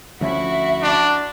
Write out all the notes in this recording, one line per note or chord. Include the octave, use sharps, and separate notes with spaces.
D2 F3 C#4 E4 F#4 E5
D4